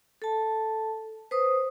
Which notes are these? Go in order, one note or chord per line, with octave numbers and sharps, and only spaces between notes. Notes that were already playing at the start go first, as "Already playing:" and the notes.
A4 A5
B4 C5 D#6